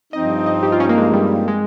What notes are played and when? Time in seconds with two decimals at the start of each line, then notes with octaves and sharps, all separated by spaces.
0.12 G2 F3 C4 D#4 D#5
0.46 D#5
0.55 C5
0.63 G4
0.72 F4
0.80 C#4
0.89 A#3
0.98 G#3
1.13 G3
1.48 G#3